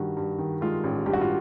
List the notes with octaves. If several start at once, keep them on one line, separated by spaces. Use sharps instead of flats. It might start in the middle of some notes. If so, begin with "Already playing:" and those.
Already playing: G2 D#3 F#4
G2
D#3
G#3 F4
A1
G2 G4
F#4
F4